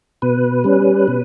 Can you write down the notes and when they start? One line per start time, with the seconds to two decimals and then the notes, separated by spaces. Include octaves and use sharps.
0.22 B2 B4
0.64 G3 C#4
1.08 B2